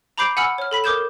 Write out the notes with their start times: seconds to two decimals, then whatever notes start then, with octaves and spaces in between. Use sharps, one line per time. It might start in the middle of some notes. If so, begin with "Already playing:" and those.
0.18 A#5 B5 D6 G6 C7 D7
0.37 F#5 G#5 B5 E6 F6 C#7
0.58 C#5 F6
0.71 A4 B5 B6
0.84 A#4 D6 D#6 G6 G#6 E7